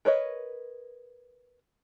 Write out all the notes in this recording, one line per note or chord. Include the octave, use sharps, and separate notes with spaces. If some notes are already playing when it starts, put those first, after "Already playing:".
A#4 B4 C#5 D#5